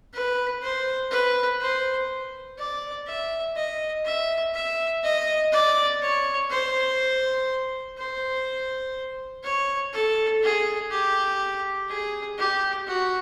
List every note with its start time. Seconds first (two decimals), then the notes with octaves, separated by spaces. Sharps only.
0.13 B4
0.62 C5
1.11 B4
1.61 C5
2.59 D5
3.07 E5
3.56 D#5
4.05 E5
4.54 E5
5.04 D#5
5.52 D5
6.01 C#5
6.50 C5
7.98 C5
9.44 C#5
9.93 A4
10.43 G#4
10.91 G4
11.89 G#4
12.38 G4
12.87 F#4